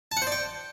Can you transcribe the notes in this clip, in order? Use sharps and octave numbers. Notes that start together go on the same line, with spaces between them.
A5
F#5
C5
D5
G5